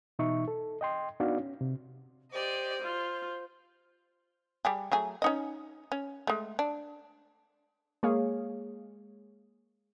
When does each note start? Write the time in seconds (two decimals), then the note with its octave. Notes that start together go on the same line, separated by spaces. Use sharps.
0.19 B2 E3 D#4 E5 C#6
0.48 A4
0.81 D#5 G5 C6
1.20 B3 D4 D#4 F#4 D5 F5
1.38 C#4
1.61 C3
2.32 G4 C5 D5 D#5
2.81 F4
4.65 G3 G4 G#4
4.92 F#3 A3 G#4
5.22 C#4 D#4 D#5
5.92 C#4
6.27 G#3 A3
6.59 D4
8.03 G#3 A#3 G#4 C#5 F5